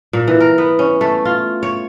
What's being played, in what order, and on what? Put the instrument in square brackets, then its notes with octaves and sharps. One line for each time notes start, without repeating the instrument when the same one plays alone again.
[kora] A#2
E3
A#4
B3
C#4
A3
F4
C#5